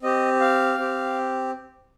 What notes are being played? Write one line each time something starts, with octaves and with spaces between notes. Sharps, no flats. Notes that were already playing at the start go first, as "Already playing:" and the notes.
C4 G4 D#5
F5
C4 G4